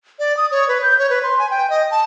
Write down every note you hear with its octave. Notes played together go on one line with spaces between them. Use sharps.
D5
D#6
C#5
B4
G6
C#5
B4
C6
G#5
G5
D#5
A5